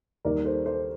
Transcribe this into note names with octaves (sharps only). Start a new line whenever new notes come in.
D#2 D#3 G3 A#4 D5
A4 C5
A4 C5